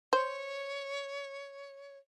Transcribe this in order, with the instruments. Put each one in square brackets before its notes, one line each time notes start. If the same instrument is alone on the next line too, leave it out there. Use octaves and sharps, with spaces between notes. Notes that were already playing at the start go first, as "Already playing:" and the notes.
[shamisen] C5 [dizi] C#5